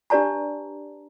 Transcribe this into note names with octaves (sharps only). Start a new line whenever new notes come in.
D4 G4 B4 D5 A5 A#5